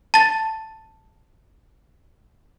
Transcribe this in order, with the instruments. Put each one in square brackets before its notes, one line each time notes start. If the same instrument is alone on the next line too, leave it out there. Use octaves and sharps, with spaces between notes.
[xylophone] A5 A6